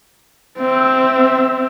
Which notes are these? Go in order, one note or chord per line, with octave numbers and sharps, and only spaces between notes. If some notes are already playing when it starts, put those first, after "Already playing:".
C4 E5